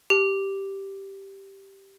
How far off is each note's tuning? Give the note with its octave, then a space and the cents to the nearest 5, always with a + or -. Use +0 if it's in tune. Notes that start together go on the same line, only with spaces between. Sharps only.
G4 -5